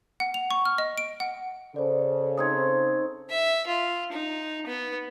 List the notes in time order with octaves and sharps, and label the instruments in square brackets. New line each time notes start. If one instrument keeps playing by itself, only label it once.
[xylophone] F#5
F7
C#6
F6
D#5
D7
F#5
[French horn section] C#3 A4 [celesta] C5 D5
[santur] C4 D#4 C#5 [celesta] D#6 G#6
[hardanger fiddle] E5
F4
D#4
B3